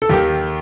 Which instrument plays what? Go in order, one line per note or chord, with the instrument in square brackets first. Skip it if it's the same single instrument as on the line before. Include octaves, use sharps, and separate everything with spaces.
[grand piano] A4
D#2 D#3 G4